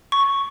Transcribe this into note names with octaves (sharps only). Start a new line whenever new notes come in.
C#6